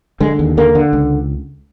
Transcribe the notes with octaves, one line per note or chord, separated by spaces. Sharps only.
D3 G#3
D#2
D3 A#3
D3
C#2